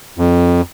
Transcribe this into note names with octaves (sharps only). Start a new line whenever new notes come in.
F2